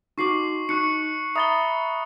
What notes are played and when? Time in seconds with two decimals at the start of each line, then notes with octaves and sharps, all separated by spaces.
0.18 D#4 F#4 C#6 D6 C7 F#7
0.69 D#4 C#6 F#6 C#7
1.36 E5 A#5 B5 D#6 A6 G7